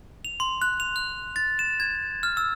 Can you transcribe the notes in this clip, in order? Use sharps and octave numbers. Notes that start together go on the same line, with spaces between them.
F7
C6
F#6
F7
F#6
A6
E7
G#6
F6
E6